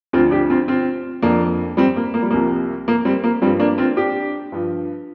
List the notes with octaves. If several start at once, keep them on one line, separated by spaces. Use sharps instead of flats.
D2 D3 F3 C4 F4
D4 G4
C4 F4
C4 F4
F2 F3 A#3 D4
G3 C4
A#3
A#3
G3
C2 C3 F3 A#3
A#3
G3 C4
A#3
G2 F3 G3 C4
A#3 D4
C4 F4
D4 G4
G2 F3